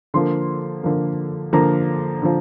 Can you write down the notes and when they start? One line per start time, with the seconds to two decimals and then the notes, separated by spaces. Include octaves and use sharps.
0.14 D3 F3 A#3 C6
0.83 D3 F3 A#3
1.53 D3 F3 A#3 A#5
2.22 D3 F3